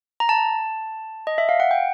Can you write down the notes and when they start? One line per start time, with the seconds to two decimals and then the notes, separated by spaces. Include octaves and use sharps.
0.20 A#5
0.29 A5
1.27 D#5
1.38 E5
1.49 F5
1.60 F#5
1.71 G5